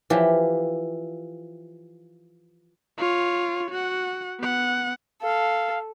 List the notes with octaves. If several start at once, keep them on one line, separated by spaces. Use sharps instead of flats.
E3 F3 G4
F4 C#5
F#4 F#5
B3 F#5
A4 F5